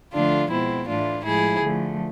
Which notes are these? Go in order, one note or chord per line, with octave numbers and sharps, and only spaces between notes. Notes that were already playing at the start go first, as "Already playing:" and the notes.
D3 F3 A3 D4 F4
B2 G#3 C4 E4
A2 E3 A3 D4 F4
A2 F3 G#3 E4 G#4
D3 F3 A3